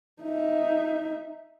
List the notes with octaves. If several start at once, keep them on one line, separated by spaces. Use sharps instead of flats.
D#4 E5